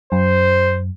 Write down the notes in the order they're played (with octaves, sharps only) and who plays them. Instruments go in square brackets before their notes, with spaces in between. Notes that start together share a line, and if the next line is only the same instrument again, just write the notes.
[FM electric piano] F#2 [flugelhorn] C5